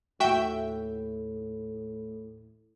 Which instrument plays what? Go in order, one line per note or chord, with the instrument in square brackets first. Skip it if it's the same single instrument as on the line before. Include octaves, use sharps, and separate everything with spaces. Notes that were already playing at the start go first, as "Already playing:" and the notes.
[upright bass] D#2 [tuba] A2 [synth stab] F#4 E5 G5